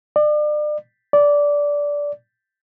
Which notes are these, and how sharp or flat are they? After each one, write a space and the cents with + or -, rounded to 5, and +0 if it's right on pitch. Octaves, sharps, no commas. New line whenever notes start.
D5 +35
D5 -15